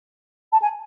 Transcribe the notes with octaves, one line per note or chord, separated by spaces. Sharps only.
A5
G#5